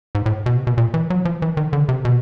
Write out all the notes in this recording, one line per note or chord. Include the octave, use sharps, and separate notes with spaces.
G#2
A2
B2
C3
B2
A#2
E3
F#3
F3
E3
D#3
D3
C3
B2